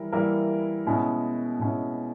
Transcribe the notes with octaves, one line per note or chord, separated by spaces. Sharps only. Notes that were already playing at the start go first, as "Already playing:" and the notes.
Already playing: E3 G3 E4 A#4
E3 G3 A#3 E4 A#4
B2 G#3 C#4 E4
B2 G#3 C#4 E4